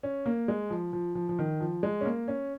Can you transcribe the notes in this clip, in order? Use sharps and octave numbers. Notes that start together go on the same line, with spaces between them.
C#4
A#3
G#3
F3
F3
F3
F3
D#3
F3
G#3
C#4
A#3
C#4